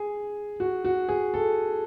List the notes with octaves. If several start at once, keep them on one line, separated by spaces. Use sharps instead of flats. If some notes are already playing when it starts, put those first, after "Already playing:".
Already playing: G#4
F#4
F#4
G#4
A4